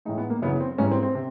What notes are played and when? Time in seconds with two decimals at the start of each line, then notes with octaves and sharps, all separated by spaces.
0.05 A2 E3 G#3 D#4
0.18 B3
0.30 A#3
0.42 F#2 C#3 E3 B3
0.60 C4
0.78 G#2 E3 G3 C#4
0.91 C4
1.03 C4
1.15 C3